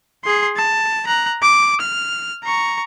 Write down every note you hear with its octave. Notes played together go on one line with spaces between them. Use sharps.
G#4 C6
A5
A#5 F#6
D6
F6
A#5 C#6